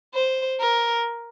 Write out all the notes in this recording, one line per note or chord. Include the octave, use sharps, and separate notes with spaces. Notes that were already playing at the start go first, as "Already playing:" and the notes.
C5
A#4